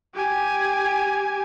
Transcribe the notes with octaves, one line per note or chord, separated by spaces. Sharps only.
G4 G#5